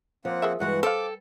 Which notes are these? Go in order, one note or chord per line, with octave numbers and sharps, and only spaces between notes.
F3 A#3 C4 F#5
G#4 A#4 E5
G2 E3 G#3 F#4 F#5
A4 C5 F5 G5 D6